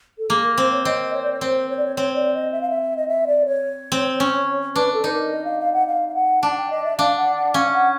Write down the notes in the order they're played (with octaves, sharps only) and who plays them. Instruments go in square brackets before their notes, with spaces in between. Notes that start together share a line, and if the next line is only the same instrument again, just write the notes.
[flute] A4
[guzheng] A#3 [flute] G#4
[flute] A#4
[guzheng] C4 [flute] C5
[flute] C#5
[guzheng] C4 [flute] D#5
[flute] C#5
D5
C#5
[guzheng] C4 [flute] C5
[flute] C#5
D5
C#5
[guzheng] C4 [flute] C#5
[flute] D5
D#5
E5
F5
E5
D#5
E5
D5
C#5
[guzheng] C4
C#4
[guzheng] D4 [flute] B4
[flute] A4
[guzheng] D#4 [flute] B4
[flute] A#4
D#5
F5
F5
F#5
F5
F5
F#5
[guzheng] D4 [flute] A5
[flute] F#5
G5
D#5
E5
[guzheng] D4 [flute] F5
[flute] F#5
F#5
[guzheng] C#4 [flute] F5
[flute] F5
F#5